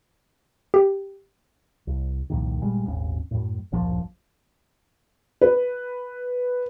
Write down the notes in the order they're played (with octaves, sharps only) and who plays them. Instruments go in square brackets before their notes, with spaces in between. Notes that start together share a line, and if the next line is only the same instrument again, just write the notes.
[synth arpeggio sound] G4
[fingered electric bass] C2
C2 F2 A#2 D#3
G1 A#2 G3 G#3
D#1 G#1 C#4
F#2 A2
D1 A#1 F#2 F3
[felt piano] B4